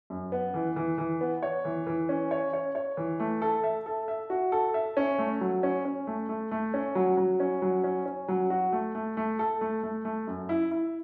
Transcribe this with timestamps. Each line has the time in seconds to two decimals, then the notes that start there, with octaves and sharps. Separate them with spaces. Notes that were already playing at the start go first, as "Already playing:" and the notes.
0.10 F#2
0.32 B3
0.54 E3
0.76 E3
0.98 E3
1.21 B3
1.43 C#5
1.65 E3
1.87 E3
2.09 C#4
2.31 C#5
2.53 C#5
2.75 C#5
2.97 E3
3.20 A3
3.42 A4
3.64 E5
3.86 A4
4.08 E5
4.30 F#4
4.52 A4
4.74 E5
4.97 C#4
5.18 A3
5.41 F#3
5.63 C#4
5.85 C#4
6.07 A3
6.29 A3
6.51 A3
6.74 C#4
6.95 F#3
7.17 F#3
7.40 C#4
7.62 F#3
7.84 C#4
8.06 C#4
8.28 F#3
8.50 F#4
8.72 A3
8.95 A3
9.17 A3
9.39 A4
9.61 A3
9.83 A3
10.05 A3
10.27 F#2
10.49 E4
10.71 E4